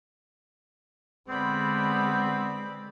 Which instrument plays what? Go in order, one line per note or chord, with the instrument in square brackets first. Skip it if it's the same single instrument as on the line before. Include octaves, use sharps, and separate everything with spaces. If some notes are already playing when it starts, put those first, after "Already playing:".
[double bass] D3 G#3 [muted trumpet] B3 [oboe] C4 [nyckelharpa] D5 B5